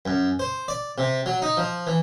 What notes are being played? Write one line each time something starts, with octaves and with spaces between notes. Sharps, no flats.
F#2
C5
D5
C3
F#3
D#4
F3
E3